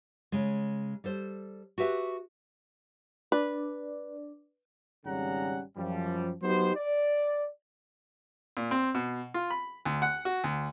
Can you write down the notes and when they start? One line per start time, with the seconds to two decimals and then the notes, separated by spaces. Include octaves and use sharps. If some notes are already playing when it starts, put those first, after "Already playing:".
0.32 C#3 G#3
1.04 G3 A4 C5
1.78 F#4 G4 B4 E5
3.32 D4 B4 D5
5.06 G#1 C#3 G3 C#4 F#5 A#5
5.77 F#2 F3 G3
6.42 F#3 B3 D#4 G4 C5
6.76 D5
8.57 A#2
8.71 C4
8.95 B2
9.34 F4
9.51 B5
9.85 D2
10.02 F#5
10.25 F#4
10.44 D2